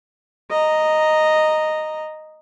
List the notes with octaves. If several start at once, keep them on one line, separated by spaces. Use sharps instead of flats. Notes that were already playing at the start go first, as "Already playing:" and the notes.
D#5 A#5